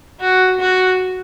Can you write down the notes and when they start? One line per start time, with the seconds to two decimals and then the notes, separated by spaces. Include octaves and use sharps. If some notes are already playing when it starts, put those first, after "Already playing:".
0.20 F#4
0.60 F#4